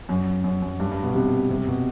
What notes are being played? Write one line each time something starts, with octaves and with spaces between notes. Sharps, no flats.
F#2
F#2
F#2
G2
G2
B2
C3
C3
B2